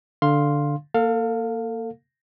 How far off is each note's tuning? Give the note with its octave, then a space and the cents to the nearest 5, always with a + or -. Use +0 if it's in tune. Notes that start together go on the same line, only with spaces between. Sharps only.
D3 +0 F5 +0 C6 +5
A#3 -10 A4 +35 F5 +10